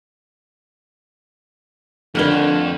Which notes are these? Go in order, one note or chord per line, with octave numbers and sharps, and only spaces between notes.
F2 D3 A3 B4 C#5 F#5 F6 G7